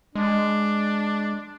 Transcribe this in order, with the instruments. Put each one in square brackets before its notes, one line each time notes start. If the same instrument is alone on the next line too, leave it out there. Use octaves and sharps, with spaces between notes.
[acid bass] G#3 [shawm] D4